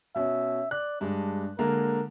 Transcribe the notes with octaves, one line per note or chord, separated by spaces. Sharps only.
B2 C#4 E5
D5 F#6
G2 G#3 D4
D3 G#3 A#3 A#4